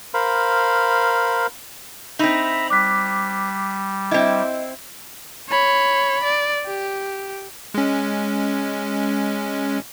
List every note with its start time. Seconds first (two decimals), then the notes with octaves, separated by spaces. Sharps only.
0.14 A#4 C5 F5 B5
2.19 C4 D#4 E5 A#5 B5
2.70 G3 D6 F#6 B6
4.11 C4 E4 D#5
5.49 C#5 B5
6.24 D5
6.67 G4
7.74 G#3 C#4